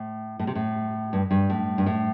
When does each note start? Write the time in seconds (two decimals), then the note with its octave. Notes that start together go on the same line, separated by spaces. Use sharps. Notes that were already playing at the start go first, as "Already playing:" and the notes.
Already playing: A2
0.39 A2
0.47 C3
0.55 A2
1.13 G2
1.31 G2
1.50 A2
1.78 G2
1.86 A2